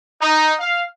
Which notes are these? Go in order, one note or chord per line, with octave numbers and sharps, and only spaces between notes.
D#4
F5